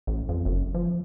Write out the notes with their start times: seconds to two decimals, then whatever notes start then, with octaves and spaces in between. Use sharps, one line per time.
0.07 A1
0.29 F2
0.45 F#1
0.74 F3